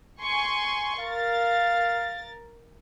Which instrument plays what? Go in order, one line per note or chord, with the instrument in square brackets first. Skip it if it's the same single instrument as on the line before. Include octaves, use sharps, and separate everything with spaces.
[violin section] G#5 C6 C#6
[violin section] A#4 A6 [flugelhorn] F5